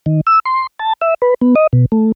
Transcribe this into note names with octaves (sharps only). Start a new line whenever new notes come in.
D#3
E6
C6
A5
E5
B4
B3
D#5
B2
A3